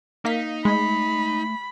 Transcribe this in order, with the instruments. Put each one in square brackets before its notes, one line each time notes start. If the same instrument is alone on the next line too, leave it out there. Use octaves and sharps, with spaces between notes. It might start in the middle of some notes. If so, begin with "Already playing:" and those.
[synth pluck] A#3 F5 B6 [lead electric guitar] D#4
[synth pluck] G#3 [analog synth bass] A3 [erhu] B5